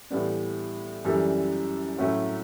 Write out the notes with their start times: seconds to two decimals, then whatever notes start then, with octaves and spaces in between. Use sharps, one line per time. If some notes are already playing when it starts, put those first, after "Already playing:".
0.10 A2 E3 G3 B3 D4
1.05 F#2 E3 G3 D4 A4
1.98 A2 F#3 A3 C#4 F#4